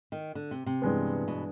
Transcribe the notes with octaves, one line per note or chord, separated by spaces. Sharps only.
D#3
D3
C3
C3
G2 E3 G#3 B3
B2